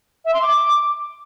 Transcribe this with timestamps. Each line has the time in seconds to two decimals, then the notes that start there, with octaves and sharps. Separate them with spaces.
0.25 E5
0.34 C6
0.42 D6